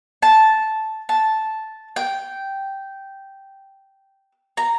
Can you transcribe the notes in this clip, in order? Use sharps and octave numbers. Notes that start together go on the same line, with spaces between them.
A5
A5
G5
A#5